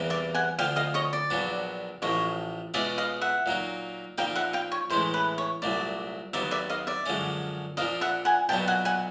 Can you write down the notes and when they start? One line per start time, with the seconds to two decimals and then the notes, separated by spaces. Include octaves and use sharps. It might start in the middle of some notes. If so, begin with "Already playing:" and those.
Already playing: E2 C3 E3 G3 A#3
0.10 D5 E5
0.34 F#5 G#5
0.59 D2 D3 F3 F5 G5
0.76 D#5 F5
0.94 C#5 D#5
1.13 D5
1.30 A#1 A#2 F#3 B3 D4
2.02 A1 A2 F3 C#5 D#5
2.74 B2 G#3 C#4 F4 G#4 D5 E5
2.98 D#5 F5
3.21 E5 F#5
3.46 A#2 F#3 A#3 D#4
4.18 A#2 F3 A#3 D#4 F5 G5
4.35 E5 F#5
4.53 F5 G5
4.72 C#5
4.90 A2 E3 G#3 C#4 C5
5.14 B4
5.38 C#5
5.62 C2 A#2 F#3 A3 D5
6.33 D#2 D#3 F#3 B3 D5 E5
6.51 D5 E5
6.70 D#5 F5
6.87 D5 E5
7.06 F#2 D3 F3 G#3 C#4
7.77 A#2 F3 A#3 D4 D#5 F5
8.01 E5 F#5
8.25 F#5 G#5
8.49 B1 A#2 F#3 B3 G5 A5
8.68 F#5 G#5
8.85 F#5 G#5